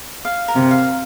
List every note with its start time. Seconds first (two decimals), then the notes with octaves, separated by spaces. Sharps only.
0.25 F5
0.48 A#4
0.56 C3
0.71 F5